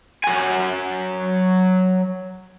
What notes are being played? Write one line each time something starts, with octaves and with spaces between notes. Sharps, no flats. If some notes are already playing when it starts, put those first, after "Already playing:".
F#3 G#5